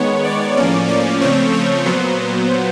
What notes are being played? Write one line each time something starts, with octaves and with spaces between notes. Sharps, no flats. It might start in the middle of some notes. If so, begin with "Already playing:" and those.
Already playing: D#3 G#3 B3 C#5
D5
A2 F3 A#3 C#4
D5
C#3 F3 A3 C4 C#5
C#5
A#2 F#3 B3 C5